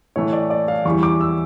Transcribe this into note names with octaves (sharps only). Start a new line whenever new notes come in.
A2 E3 A3 C#5
D5
D5
F5
E2 E3 G3 C#6
D6
E6